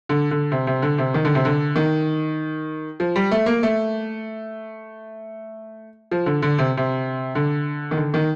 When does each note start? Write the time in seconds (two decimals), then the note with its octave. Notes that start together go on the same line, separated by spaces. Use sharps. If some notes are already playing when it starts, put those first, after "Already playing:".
0.09 D3
0.31 D3
0.52 C3
0.67 C3
0.82 D3
0.98 C3
1.14 D#3
1.25 D3
1.35 C3
1.45 D3
1.76 D#3
3.00 F3
3.16 G3
3.31 A3
3.46 A#3
3.63 A3
6.11 F3
6.26 D3
6.42 D3
6.58 C3
6.77 C3
7.35 D3
7.91 D#3
7.97 D3
8.14 D#3